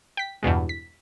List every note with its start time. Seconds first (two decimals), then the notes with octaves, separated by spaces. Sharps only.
0.17 G5 B6
0.43 E2 G2 B2 G#3
0.69 B6